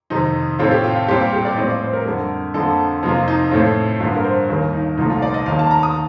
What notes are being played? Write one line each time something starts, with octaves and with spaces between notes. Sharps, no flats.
F2 C3 D#3 D#4
A2 A3 C4 F4
G4
F4
F4
A#2 G3 C4 G4
F4
G4
D5
A2 F3 C4 D#5
D5
C5
A#4
F2 D3 G3
F2 D3 F3 A#3 A4
F2 C3 F3 A#3 F4
D#4
A2 A3 C4 F4
G2 D3 F3 A#3 F4
A#4
C5
D#2 D#3 G3 A#3 A#4
D#4
C2 A#2 F3 A3 D#4
F4
D5
D#5
D#2 D#3 A#3 F5
A5
A#5
D#6